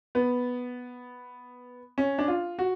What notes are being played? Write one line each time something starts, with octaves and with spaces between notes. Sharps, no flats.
B3
C#4
D4
F4
F#4